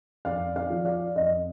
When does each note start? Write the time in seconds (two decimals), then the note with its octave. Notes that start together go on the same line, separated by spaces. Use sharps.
0.25 F2 D5 F5
0.56 D5 F5
0.70 F3
0.85 D5 F5
1.16 F2 D#5